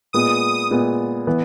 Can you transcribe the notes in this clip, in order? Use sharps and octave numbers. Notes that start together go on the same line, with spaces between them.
A#2 G#3 B3 D#6
A#2 G#3 B3
E3 B3